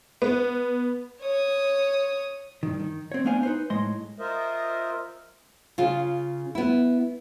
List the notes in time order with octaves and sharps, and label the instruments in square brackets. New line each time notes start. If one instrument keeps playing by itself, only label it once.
[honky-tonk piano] B3
[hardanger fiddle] C#5 D#6
[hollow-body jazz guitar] G2 D#3
D#3
C4 C#5
A3 B3 D4 C5 F5 G#5
D#4 B4 C5
A2 G#3 D#5 C6
[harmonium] F4 A#4 C5 D#5 E5
[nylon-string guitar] C#3 F4
B3 E4